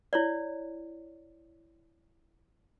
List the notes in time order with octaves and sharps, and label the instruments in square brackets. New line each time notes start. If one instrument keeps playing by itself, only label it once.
[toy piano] E4 C#5 D5